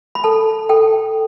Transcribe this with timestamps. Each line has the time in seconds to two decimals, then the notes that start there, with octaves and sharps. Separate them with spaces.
0.15 B5
0.24 A4 A5
0.69 A4 G5